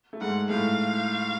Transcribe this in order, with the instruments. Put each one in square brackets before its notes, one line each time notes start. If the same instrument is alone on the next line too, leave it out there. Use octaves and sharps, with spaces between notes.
[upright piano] A3
[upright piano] G#2 G#3 [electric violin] F#5
[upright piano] A2 A3 [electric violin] F5